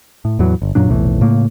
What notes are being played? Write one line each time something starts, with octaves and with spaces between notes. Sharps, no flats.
A2
E2 A2 E3 F#3
G1
F#2 A#2 F#3 D4
F1 B1 A2 E3
A2 C#3 A3 A#3